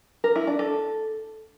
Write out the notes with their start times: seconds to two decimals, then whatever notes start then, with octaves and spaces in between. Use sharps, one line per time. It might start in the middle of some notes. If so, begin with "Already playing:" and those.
0.24 A#4
0.36 E4
0.47 D4
0.59 A4